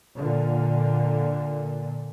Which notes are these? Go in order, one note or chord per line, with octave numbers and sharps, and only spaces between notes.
A#2 D3